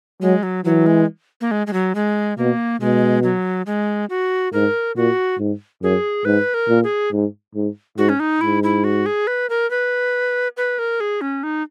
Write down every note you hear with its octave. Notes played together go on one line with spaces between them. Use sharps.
F#3 G#3
F#3
E3 F#3
G#3
A#3
G#3
G#3
F#3
G#3
B2 A#3
B2 G#3
F#3
G#3
F#4
G#2 A#4
A#2 F#4
G#2
F#2 G#4
G#2 B4
A#4
A#2
G#4
G#2
G#2
G#2 F#4
C#4
D#4
G#2 E4
E4
F#4
G#4
B4
A#4
B4
B4
A#4
G#4
C#4
D#4